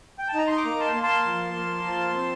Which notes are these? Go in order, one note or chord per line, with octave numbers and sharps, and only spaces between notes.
G5
A5
D#4 A#5
C6
A#5 D6
A#3
A5 C6
A#3
A5 C6
F3
A#3
F3
C4